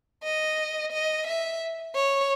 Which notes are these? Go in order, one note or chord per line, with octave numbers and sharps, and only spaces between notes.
D#5
D#5
E5
C#5